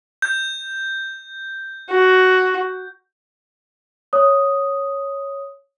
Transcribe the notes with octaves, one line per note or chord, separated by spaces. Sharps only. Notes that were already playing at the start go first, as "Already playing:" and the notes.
G6
F#4
C#5 D#6